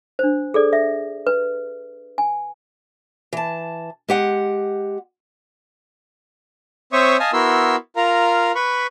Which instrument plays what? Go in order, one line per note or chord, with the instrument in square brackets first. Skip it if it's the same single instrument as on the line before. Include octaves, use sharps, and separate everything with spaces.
[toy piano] D4 C5
G#4 A4 D5
E5
B4
G#5
[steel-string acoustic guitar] E3 A5
G#3 G4 F#5
[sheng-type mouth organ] C4 C5 C#5 E5 C#6 D#6
D#5 F5 G#5 A5 D#6
B3 E4 F#4 A#4 C6 E6
F4 A#4 F5 A#5
B4 B5 C#6